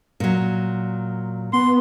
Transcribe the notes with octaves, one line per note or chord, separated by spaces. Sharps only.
A#2 F#3
B3 C6